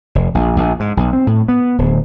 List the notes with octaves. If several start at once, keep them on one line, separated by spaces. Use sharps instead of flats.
F1
A#1
A#1
G#2
B1
C4
A2
B3
D1